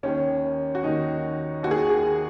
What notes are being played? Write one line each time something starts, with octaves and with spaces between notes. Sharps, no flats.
D#2 D#3 C#4
F#4
D#2 D#3 D#4
D#2 D#3 F#4 G#4
F#4
G#4